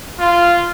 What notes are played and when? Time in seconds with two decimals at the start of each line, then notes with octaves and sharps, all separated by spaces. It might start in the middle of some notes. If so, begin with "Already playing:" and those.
0.19 F4